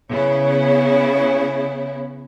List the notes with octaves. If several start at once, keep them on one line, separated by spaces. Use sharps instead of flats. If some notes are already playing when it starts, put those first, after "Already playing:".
C#3 B3 E4 C#5